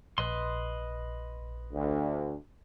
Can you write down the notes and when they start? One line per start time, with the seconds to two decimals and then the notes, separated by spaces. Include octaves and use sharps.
0.18 A#1 B4 D#5 C6
1.73 D2